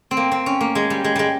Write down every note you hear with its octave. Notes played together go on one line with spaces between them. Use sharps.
C4
A#3
C4
C#4
A#3
G#3
G3
G#3
G3 G#3